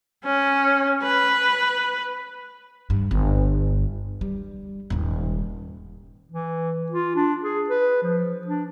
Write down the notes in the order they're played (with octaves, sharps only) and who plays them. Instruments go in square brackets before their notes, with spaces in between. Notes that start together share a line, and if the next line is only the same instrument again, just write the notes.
[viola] C#4
B4
[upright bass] G2
G1
G3
D#1 G#2
[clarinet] E3
F4
D4
G#4
B4
F3
D4